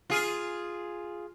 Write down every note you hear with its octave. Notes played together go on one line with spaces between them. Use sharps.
F4 G#4